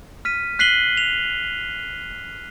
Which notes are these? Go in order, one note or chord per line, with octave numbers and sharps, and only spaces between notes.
F6 B6 D#7
F#6 B6 C7 D#7 F#7 G7
F7